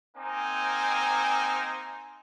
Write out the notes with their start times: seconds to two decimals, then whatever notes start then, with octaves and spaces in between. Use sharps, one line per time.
0.17 A#3 C4 D#4 G#5